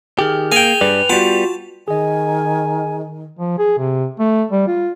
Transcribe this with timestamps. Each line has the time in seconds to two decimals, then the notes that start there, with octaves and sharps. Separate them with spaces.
0.19 D#3 G4 G#4 F6
0.52 A#3 G#4 G5 G#5 F7
0.81 G2 G3 B4 D5
1.10 G3 B3 F4 F#4 A5
1.88 D#3 G#4 D#5 G#5
3.39 F3
3.58 G#4
3.78 C3
4.19 A3
4.51 G3
4.67 F4